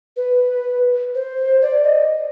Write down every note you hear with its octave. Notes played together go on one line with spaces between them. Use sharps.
B4
C5
D5
D#5